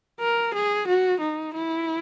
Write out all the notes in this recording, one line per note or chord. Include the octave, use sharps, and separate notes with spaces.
A#4
G#4
F#4
D#4
E4